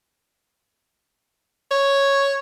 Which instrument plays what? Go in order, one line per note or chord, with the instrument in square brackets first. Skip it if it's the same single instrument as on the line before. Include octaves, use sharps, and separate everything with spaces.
[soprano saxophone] C#5